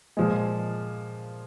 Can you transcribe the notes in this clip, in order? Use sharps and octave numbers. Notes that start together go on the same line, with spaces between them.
A#2 F3 G#3